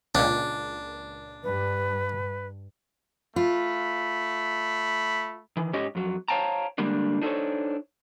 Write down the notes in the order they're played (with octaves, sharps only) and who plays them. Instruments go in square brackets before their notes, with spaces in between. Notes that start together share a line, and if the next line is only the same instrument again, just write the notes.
[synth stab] C#2 A#2 [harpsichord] D4
[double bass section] G2 [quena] B4
[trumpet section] A3 B5 [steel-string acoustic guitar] F4
[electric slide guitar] D#3 E3
G#2 C#4 G4 C#5 D#5
F2 F#3
C5 C#5 F5 G5 A5 A#5
D3 G3 G#3 A#3 D4
D4 D#4 A4 A#4 C5 C#5